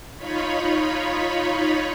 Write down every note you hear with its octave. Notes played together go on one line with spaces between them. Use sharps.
D#4 F4 C#5 B5